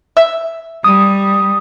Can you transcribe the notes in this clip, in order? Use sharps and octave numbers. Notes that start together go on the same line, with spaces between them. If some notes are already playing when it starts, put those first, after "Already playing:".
E5
G3 D#6